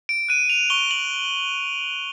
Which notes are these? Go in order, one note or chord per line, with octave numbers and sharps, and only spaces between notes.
D7
F#6 D#7
F7
C#6 G7
F#7